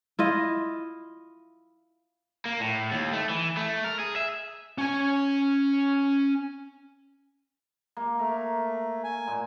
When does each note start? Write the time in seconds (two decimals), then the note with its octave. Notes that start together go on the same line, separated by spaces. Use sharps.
0.19 E4 F4 D#5
2.46 A#3
2.60 A2
2.91 D#2
3.13 A3
3.30 E3
3.57 A3
3.84 A#4
3.99 G#4
4.16 E5
4.78 C#4 G#5
7.97 A#3
8.19 A3 A#4
9.04 G#5
9.28 A#2